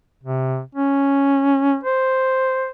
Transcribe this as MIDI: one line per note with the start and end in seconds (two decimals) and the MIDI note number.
0.24 0.60 48
0.75 1.77 61
1.84 2.70 72